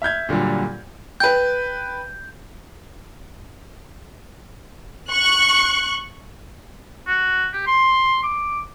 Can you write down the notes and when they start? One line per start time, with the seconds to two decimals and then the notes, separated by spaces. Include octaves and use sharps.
0.02 E5 F6 G6 G#6
0.29 A#2 D3 F#3 G3
1.20 B4 G5 G6
5.10 C#6 F#6
7.07 F#4
7.53 G4
7.67 C6
8.23 D6